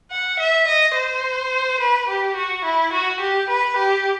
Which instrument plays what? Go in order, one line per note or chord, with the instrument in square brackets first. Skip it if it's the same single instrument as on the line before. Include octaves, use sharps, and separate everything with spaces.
[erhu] F#5
E5
D#5
C5
B4
G4
F#4
E4
F#4
G4
B4
G4